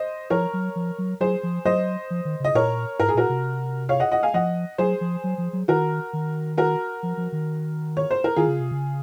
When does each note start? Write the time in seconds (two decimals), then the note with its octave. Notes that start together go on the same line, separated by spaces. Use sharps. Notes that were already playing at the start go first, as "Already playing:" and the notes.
Already playing: C5 D#5
0.30 F3 A#4 C#5
0.53 F#3
0.76 F3
0.98 F#3
1.20 F#3 G#4 C5
1.43 F3
1.65 F#3 C5 D#5
2.10 F3
2.25 D#3
2.40 C#3 D#5
2.54 A#2 A#4 C#5
2.99 G#2 A#4
3.09 G#4
3.14 A#2 F#4 A#4
3.29 C3
3.89 C#5 F5
4.00 D#5 F#5
4.11 D#5 F#5
4.23 F5 G#5
4.34 F3 D#5 F#5
4.78 F#3 G#4 C5
5.01 F3
5.24 F#3
5.38 F3
5.53 F#3
5.68 D#3 F#4 A#4
6.13 D#3
6.58 F#4 A#4
7.03 F3
7.17 F3
7.32 D#3
7.97 C#5
8.11 C5
8.24 A#4
8.36 D#3 F4 G#4
8.48 C#3
8.60 C3
8.71 C#3